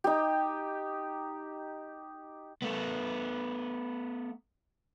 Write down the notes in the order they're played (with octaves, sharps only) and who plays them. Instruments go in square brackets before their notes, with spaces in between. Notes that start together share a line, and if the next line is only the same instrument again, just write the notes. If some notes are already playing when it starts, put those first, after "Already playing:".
[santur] D#4 G4
[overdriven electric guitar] A3 B3